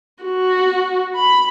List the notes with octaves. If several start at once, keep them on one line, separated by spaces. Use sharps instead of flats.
F#4
B5